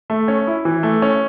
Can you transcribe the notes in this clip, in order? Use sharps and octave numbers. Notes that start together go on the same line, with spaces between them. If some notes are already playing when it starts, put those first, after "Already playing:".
A3
C#4
E4
E3
A3
C#4